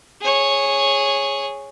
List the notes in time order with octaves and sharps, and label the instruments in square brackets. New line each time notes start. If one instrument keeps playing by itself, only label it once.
[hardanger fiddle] G#4 C#5